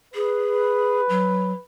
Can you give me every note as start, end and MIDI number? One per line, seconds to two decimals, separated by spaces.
0.15 1.01 68
0.15 1.62 71
1.09 1.53 54